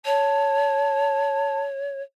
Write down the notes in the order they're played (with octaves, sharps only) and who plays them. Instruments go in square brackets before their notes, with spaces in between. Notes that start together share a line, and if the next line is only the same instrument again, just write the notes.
[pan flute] C#5 [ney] A5